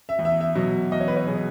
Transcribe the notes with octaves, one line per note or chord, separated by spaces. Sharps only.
E5
E2
E5
E5
B2 F#3
E2 D#5
C#5
B4
C#5
B2 F#3 G#4